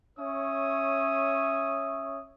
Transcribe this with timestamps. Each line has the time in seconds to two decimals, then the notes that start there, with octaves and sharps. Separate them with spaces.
0.18 C#4 C#5 E5 D#6